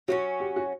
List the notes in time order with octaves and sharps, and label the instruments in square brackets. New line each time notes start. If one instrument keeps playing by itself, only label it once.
[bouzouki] F#3 A#3 C#4 [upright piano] F#4
[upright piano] G4
F#4